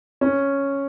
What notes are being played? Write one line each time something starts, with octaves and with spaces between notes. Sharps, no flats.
C#4